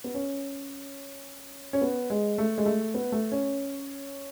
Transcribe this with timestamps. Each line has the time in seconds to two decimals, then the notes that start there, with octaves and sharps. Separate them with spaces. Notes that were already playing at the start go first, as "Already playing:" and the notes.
0.04 B3
0.14 C#4
1.73 C#4
1.82 B3
2.10 G#3
2.38 A3
2.58 G#3
2.66 A3
2.94 B3
3.12 A3
3.32 C#4